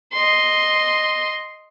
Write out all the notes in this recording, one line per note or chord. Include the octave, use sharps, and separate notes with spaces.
D#5 C6